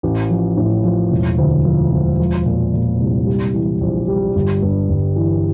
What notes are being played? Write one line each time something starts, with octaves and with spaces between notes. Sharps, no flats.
A1
F3
A2
F3
E1
D2
F3
E1
F3
A#2
A#2
C2
G3
E3
A#1
G3
G1
G2
G1
E3